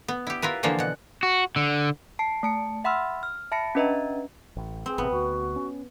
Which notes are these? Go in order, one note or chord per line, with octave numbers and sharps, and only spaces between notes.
B3
E4 G4
E4 F4 A#4 B4
D3 E3 F3 A#3 F4 C5
B2 F#5
F#4
D3
A5 C7
A3 A5 C#7
E5 F#5 B5 C6 E6 F6
F6
E5 A5 B5 A#6 C#7
C#4 D4 B4 D#5 E5 A#5
A1
C4 G#4
A1 C3 B3
D2 F#4
C#4